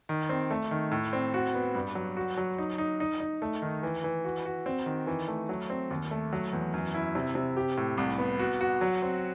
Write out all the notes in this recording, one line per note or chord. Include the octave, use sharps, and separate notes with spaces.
D#3
C4
A3
D#3
A2
C4
F#4
B3
G2
F#3
F#4
F#3
D#4
D#4
D#4
D#4
A3
D#3
E3
E3
F#4
F#4
C4
D#3
E3
A3
F#3
C4
D#2
A3
F#3
E2
F#2
E4
C3
C3
G4
A2
C2
B3
F#4
F#4
F#3
C4